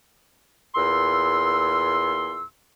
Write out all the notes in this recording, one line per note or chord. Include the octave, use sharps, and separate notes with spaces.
E2 A#2 C6 E6